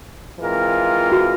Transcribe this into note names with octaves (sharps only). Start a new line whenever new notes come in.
E3 G#3 C4 F4 A#4
F#4